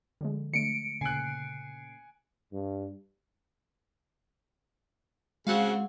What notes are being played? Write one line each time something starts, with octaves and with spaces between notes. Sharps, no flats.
D3 F3 G#3
D3 A3 C#7 D7
A#2 C#3 G#5 F#6 C7
G2
C#3 G#3 C4 F#4 F5 F#5